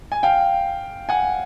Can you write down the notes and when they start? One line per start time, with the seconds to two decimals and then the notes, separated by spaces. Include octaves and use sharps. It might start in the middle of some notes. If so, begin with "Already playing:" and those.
0.12 G#5
0.23 F5 G5
1.09 F#5 G#5